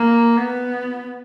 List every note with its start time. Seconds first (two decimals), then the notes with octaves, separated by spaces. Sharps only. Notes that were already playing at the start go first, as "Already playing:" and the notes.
Already playing: A#3
0.37 B3